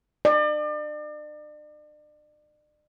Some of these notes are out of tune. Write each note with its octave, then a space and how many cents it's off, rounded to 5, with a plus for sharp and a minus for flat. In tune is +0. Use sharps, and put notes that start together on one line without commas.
D5 +40